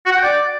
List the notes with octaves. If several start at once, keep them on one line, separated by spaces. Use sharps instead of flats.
F#4
F#5
G5
D5